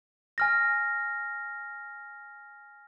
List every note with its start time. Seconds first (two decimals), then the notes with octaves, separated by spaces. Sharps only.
0.38 G#5 F6 A#6